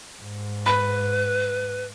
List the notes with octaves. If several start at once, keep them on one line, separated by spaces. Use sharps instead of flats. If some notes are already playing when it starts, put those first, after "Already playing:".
G#2
B4 B5